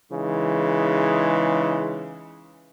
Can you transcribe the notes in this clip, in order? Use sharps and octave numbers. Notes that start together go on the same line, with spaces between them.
C#3 E3 G#3 D#4